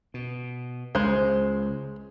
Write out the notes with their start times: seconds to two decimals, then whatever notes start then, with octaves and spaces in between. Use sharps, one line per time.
0.14 B2
0.95 C#2 G#3 C5